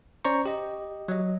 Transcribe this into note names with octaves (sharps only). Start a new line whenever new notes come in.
C#4 C5 D5 A#5 C#6
G4 D#5
F#3 D#5